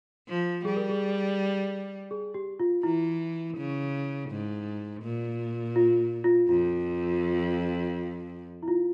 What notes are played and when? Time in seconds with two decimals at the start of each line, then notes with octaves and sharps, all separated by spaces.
0.28 F3
0.65 G3 G#4
0.77 A#4
0.89 G#4
2.11 G#4
2.34 G4
2.60 F4
2.83 E3 E4
3.57 C#3
4.30 G#2
5.02 A#2
5.76 F4
6.24 F4
6.48 F2 F4
8.63 E4
8.68 F4